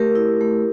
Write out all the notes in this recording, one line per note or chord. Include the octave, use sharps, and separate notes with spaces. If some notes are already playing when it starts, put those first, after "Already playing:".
Already playing: A3 G4 A#4
E4
A3